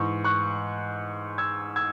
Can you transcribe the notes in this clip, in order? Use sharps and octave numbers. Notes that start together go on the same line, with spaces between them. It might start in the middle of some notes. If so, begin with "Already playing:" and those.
Already playing: G#2 E3 C#6
C#6 F#6
E6 G#6
E6 G#6